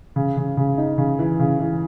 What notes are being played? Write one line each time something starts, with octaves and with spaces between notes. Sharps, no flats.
C#3
C#3
C#3
D#4
C#3
E3
C#3
E3